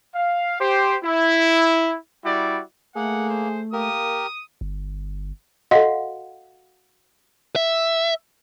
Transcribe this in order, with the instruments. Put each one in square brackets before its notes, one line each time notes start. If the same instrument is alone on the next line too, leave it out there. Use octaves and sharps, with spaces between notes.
[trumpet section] F5
G4 C5
E4
G3 E4 F#4 D5
[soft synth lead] A3 [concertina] A#3 [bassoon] G#4 [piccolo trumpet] F#5
[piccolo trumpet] C5
[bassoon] A#3 [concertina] G4 A#4 [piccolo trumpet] D#6
[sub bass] G1
[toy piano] F#4 F5 F#5 [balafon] A4 D#5
[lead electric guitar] E5